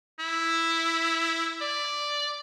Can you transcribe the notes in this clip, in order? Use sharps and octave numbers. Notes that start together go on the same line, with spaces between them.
E4
D5